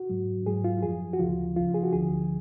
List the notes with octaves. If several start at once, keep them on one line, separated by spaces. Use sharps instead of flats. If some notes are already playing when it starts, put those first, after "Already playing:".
Already playing: F#4
G#2 F#3
G#2 F#3 G#4
F4
F#2 F3 G#4
F#4
D2 C#3 F3 F4
C#2 C#3 F3 F4
G#4
F#4
D2 D3 F3 G#4